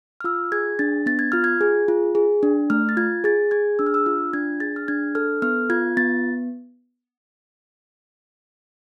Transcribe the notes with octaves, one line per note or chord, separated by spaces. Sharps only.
F6
F4 E6
G#4 G#6
D4 A6
B3 A6
G#6
F4 F6
G#6
G#4
F4
G#4
D4
A3 F6
A6
F4 G#6
G#4 A6
G#4 G#6
D4 E6
F6
E6
F4 F6
D4 G#6
G#4 A6
F6
D4 G#6
A4 F6
B3 F6
F4 G#6
B3 A6